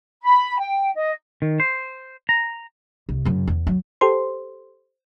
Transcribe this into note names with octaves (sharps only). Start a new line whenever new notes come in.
B5
G5
D#5
D#3
C5
A#5
C2
F#2 C#3
E2
F#3
G4 A4 C5 C6